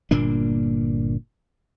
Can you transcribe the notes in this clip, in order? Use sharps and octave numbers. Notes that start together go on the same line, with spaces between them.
G1 A#2 A#3 D4